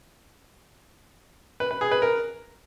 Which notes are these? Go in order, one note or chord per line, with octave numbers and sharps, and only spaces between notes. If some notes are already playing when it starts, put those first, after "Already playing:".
B4
B4
G#4
B4
A#4